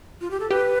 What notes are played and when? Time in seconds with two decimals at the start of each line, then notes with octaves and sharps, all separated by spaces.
0.21 F4
0.31 G4
0.40 A4
0.50 G4 B4